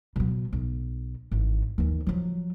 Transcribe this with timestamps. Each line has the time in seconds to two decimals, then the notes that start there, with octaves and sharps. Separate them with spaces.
0.16 B2 F#3
0.53 B1
1.31 G#1 E3
1.78 D#2 E3
2.07 F3 F#3